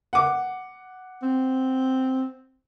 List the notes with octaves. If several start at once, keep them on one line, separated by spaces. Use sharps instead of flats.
F#5 D6
C4